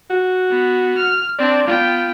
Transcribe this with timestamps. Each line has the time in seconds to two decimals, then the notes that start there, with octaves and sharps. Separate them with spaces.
0.10 F#4
0.50 B3
0.97 F6
1.39 C4 D4 D5
1.67 B3 F4 G5